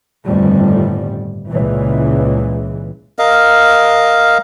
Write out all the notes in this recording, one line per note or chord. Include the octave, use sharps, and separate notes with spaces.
G1 F2 A2 D#3 G3
C#2 A#2 E3
A#4 D#5 F5